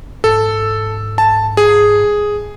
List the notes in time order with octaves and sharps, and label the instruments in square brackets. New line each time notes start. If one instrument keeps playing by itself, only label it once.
[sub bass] G#2 [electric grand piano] A4
[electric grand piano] A5
G#4